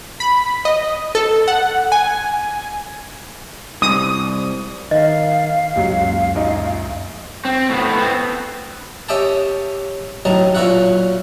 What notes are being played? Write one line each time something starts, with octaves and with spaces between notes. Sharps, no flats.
B5
D#5
A4
F#5
G#5
C2 D#6
D#3 D#5 F5
C#2 F#2 A#2 F#3 G#3
A#1 D#4
C4
A2 B3
B3 C4
C#4 G4 D#5 E5 G5 A5
A1 F#3 D#4 A5
A#2 F#3 F4 F#4 E5 F#5